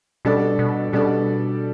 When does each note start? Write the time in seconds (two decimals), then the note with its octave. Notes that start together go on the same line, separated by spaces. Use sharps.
0.25 B2 G3 D4 A4 D5
0.59 B2
0.93 B2 G3 D4 A4 D5